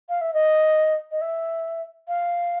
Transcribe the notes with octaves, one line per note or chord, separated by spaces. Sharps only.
F5
E5
D#5
D#5
E5
F5